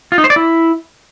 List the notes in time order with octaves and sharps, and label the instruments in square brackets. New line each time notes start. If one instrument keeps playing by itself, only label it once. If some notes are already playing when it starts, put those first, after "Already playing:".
[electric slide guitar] F4
D#4
C5
D5
E4